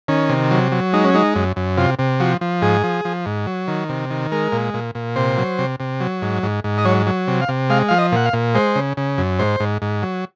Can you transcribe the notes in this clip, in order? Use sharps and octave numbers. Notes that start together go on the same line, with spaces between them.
D#3 C#4
C3
F#3
F#3
G#3 D#4
C#4
G#3 D#4
F#2
F#2
C3 F4
C3
F3 F#4
F3
G#2 G#4
F3
F3
G#2
F#3
D#3
C3
D#3
G#3 A#4
A#2
A#2
A#2
C3 C5
F#3
C3
C3
F#3
G#2
G#2
G#2
D#5
F#3 C#5
F#3
C3
F5
C3
G#3 F5
F3 F5
D#5
A#2 F#5
F5
A#2
G#3 C5
C#3
C#3
F#2
G#2 C5
G#2
G#2
F#3